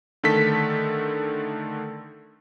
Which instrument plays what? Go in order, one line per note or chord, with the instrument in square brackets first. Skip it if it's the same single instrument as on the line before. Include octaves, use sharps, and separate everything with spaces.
[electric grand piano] D3 D#3 A3 A4 B6